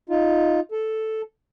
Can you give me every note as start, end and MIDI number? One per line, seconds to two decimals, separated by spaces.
0.09 0.60 63
0.09 0.60 65
0.72 1.22 69